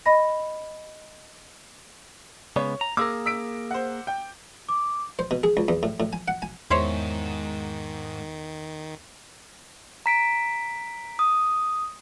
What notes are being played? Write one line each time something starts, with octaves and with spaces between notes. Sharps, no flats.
D#5 B5 A#6
C#3 G#3 B3 C#5
A#5
A#3 G#4 A#4 D6 E6
E6 B6 D7
C5 F#5
G5
D6
C5
B2
G#4
C#2
E2
A2
A2
G#5
F#5
G#5
E2 G#2 D#3 E4 C5 C#5
A#5 B6 D7
D#6